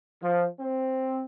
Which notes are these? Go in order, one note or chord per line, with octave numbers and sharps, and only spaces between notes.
F3
C4